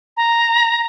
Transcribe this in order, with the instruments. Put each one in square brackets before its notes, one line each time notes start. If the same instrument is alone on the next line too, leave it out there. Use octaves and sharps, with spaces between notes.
[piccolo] A#5